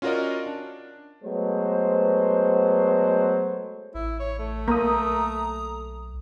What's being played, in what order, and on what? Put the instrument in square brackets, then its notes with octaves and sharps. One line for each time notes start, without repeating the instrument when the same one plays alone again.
[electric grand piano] C#4 F4 F#4 A#4 D5 D#5
D4
[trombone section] F#3 G#3 A3 B3 B4 C5
[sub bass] A1 [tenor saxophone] E4
[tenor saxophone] C#5
A3
[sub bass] B1 [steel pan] A#3 [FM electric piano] A#5 D#6